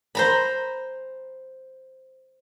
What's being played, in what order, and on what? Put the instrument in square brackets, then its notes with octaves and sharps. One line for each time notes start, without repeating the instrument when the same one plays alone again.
[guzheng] C5 A#5 B5